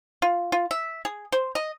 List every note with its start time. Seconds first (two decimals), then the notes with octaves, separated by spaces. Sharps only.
0.22 F4
0.52 F4
0.71 E5
1.05 G#4
1.32 C5
1.55 D#5